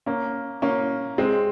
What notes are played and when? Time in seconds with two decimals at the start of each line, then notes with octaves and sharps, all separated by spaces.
0.06 A#3 C#4
0.62 A#3 C#4
1.18 G#3 C4